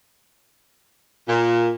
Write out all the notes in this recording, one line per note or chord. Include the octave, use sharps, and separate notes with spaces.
A#2